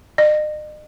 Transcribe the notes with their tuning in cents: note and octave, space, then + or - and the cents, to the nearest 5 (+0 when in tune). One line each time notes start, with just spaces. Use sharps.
D#5 -40